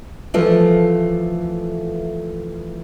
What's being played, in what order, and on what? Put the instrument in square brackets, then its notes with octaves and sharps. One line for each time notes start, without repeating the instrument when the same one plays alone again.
[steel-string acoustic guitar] E3 F3 A3